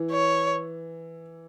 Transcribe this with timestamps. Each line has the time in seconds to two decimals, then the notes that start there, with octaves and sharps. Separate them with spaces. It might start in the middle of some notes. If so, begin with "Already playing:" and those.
Already playing: E3
0.11 C#5